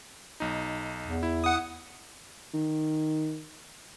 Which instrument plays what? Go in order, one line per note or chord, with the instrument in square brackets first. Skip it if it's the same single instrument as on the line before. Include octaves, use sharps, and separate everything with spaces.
[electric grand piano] B1 D#4
[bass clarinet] E2
[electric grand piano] E4
[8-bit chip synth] F#5 D#6
[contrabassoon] D#3